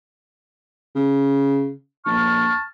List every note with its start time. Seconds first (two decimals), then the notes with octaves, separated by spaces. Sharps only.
0.96 C#3
2.06 A#1 A5 C#6 F6